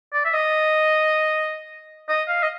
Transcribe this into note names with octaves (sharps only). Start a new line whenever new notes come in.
D5
E5
D#5
D#5
F5
D#5